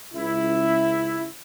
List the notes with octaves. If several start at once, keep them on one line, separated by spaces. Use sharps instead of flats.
C#2 E4